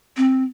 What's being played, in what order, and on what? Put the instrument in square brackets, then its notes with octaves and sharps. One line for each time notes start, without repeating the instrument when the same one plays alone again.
[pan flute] C4